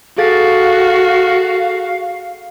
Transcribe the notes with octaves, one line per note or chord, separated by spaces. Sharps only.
F#4 G#4 A4 F5 A6